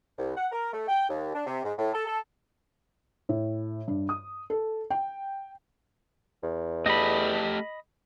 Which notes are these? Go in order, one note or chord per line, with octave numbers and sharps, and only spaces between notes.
C2
F#5
A#4
A3
G5
D#2
D4
C3
G#2
A2
A4
A4
A2
G2
D#6
A4
G5
E2
A3 G4 A4 D#5 B5